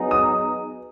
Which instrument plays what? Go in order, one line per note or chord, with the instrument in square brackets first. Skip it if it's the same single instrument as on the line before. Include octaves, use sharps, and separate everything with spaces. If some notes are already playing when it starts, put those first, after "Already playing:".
Already playing: [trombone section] F#3 B3 D#4 G#4 B4
[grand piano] D#6